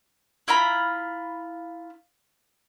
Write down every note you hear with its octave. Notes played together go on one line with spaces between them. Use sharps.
E4 F4 A#5 B5